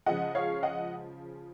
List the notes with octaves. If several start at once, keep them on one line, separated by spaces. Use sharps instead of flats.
C#3 F3 G#3 D#5 F#5
C#5 F5
D#5 F#5